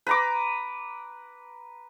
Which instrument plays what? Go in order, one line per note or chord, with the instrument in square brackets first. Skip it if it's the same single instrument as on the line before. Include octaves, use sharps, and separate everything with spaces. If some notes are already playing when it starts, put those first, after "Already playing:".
[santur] B4 A#5 D6